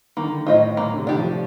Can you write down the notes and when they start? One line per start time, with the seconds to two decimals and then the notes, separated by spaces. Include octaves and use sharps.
0.17 D#3 A#3
0.24 D3
0.32 D#3
0.47 A2 F4 C5 D#5
0.77 A#2 A#3
0.93 D3
0.98 C3
1.07 D#3 D4 G4
1.18 F3